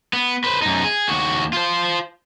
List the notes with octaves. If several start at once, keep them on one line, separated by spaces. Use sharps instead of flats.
B3
B4 C5
F#2 D#4
G#4
D#2 F#4
F4 C5